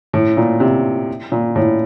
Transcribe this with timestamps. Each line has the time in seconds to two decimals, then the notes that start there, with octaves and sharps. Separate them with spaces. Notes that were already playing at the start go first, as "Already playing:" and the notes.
0.14 A2
0.37 A#2
0.60 C3
1.32 A#2
1.56 A2